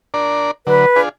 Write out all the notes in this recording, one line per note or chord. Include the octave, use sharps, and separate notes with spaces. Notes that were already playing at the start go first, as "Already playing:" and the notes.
D4 A#4 D5
D3 F#3 B4
D4 F4 G#4